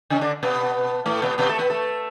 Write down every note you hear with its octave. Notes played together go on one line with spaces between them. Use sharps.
C#3 C#4
D3 D4
B2 B3
A2 A3
B2 B3
B2 B3
A3 A4
B3 B4
A3 A4